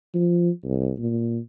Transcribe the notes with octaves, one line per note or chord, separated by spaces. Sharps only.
F3
C2
A#2